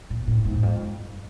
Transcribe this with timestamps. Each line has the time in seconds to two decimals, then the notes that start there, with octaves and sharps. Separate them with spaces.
0.10 A#2
0.28 A2
0.45 G#2
0.55 E2
0.63 F2
0.81 G2